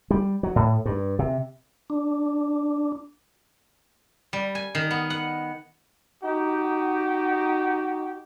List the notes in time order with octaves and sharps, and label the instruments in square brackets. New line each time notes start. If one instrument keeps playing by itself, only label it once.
[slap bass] G3
F#3
A2
G2
C3
[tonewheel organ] D4
[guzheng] G3
G#5
D#3
B3
F#5
[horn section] D#4 F#4 G4